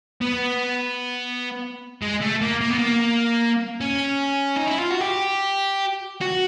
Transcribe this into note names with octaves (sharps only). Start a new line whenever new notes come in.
B3
G#3
A3
A#3
A#3
B3
A#3
C#4
D#4
E4
F4
F#4
G4
F#4